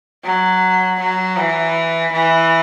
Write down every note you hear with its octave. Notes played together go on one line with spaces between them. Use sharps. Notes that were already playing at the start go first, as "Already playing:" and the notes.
F#3
F#3
E3
E3